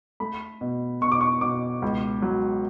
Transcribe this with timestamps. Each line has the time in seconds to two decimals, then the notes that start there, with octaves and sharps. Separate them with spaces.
0.20 A3 B5
0.61 B2
1.01 B2 C#6
1.12 D6
1.21 C#6
1.41 B2 D6
1.82 C#2
2.22 F#3